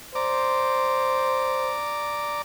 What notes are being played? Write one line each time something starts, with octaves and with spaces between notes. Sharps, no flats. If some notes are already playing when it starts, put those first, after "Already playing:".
C5 D5 A#5 D6